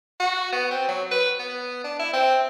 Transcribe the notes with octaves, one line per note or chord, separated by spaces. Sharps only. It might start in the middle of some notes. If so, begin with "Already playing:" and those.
F#4
B3
C4
F#3
B4
B3
D4
E4
C4